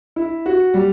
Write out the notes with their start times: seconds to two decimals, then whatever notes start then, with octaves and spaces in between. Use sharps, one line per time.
0.16 E4
0.46 F#4
0.74 G3